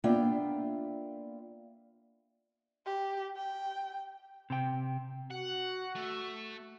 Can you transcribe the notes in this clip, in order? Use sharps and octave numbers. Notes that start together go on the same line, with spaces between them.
A#3 B3 D4 F4 E5 G5
G4
G5
C3 G5
F#4 F#5
A3